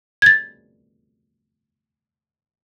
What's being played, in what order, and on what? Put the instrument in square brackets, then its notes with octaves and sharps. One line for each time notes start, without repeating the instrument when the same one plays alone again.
[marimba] G#6 A6